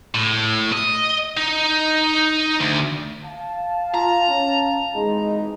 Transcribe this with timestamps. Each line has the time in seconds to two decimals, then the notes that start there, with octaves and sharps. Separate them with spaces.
0.14 A2
0.72 D#5
1.37 D#4
2.61 D2
3.25 F5 A5
3.94 F4 A#5
4.29 C#4
4.95 G#1 E3 G#3 D#4